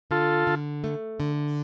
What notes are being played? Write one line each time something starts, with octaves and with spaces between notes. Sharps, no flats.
D3 F4 A4
D3
A3
D3